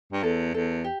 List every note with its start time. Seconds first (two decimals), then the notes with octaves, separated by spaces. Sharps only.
0.12 G2
0.23 E2 A4
0.54 E2 A4
0.84 G4